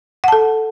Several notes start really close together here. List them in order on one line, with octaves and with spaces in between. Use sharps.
F#5 A5 A4